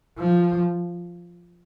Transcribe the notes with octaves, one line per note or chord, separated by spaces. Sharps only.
F3